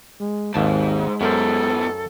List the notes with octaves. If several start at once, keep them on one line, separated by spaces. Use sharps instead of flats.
G#3
G#1 D#2 G#2 G#3 A5
F#2 A2 B3 A4 A#4 C5